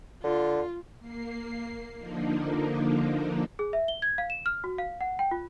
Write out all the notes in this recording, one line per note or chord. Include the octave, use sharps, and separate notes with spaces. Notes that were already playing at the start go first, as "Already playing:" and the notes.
D3 F4
A#3 C7
D3 F3 A#3 D4 D#4
G#4
E5
G7
G#6
F5
E7
F6
F#4
F5
F#5
G5
F4